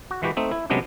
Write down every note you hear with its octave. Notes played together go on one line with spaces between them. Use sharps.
F#4
E3 G#3 F#4 G4 B4
A3 C4 D#4
E4
C3 F#3 G#3 B3 C#4 D4